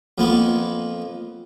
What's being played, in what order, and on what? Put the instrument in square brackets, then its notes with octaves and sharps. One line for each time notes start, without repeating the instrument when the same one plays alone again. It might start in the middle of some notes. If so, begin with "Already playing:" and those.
[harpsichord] F2 A#3 B3